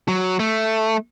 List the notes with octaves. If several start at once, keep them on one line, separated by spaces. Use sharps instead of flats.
F#3
A3